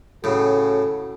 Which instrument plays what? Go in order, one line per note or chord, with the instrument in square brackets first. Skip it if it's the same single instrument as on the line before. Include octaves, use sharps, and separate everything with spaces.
[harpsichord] A2 C#3 [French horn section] C#4 F#4 A4